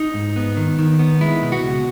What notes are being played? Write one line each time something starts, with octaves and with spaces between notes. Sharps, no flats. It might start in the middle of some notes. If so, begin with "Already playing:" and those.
Already playing: D#4
G#2
B3
D#3
D#3
B3
G#3 E4
B2
F#4
C#2